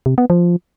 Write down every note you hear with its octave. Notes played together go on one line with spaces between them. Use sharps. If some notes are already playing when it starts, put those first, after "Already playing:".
C3
B3
F3